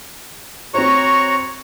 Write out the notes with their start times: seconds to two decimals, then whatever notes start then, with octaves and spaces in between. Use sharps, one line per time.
0.74 C4 F#4 C5 C#5 A#5 C#6